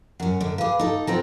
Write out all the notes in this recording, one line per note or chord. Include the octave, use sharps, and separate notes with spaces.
F#2 C#4 F#5
F#2 D3
G#4 B4 F5 D6
D#4 A4
B3 C4 F4 A#5 A#6